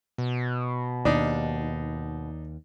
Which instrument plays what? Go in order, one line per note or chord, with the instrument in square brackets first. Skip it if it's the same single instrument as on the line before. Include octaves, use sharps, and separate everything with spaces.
[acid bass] B2
[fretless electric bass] D#2 [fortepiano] D4 D#4